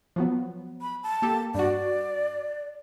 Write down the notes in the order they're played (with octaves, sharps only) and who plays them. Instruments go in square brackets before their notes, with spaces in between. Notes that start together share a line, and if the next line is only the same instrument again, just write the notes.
[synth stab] F3 F#3 B3
[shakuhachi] B5
A5
[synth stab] A#3 G4 A4
[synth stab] G2 F#4 [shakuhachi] D5